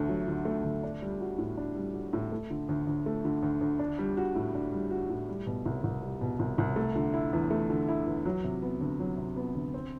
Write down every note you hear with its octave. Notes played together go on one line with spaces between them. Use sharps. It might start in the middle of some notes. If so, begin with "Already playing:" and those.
Already playing: D2 D3 A3
F#3
D3
A3
D2
D4
G3
F#4
A2
D4
G3
F#4
A2
A3
D3
D2
D2
A3
D3
D2
D2
D4
G3
F#4
A2
D4
G3
F#4
A2
G3
B2
C2
C2
G3
B2
C2
C2
A3
D3
E4
E2
A3
D3
E4
E2
F#3
C3
B3
D2
F#3
C3
B3
D2
C4